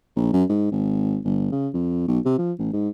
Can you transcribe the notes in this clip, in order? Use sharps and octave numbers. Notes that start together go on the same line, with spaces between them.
A#1
F#2
G#2
G#1
G1
C#3
F2
B1
C3
F3
A1
G#2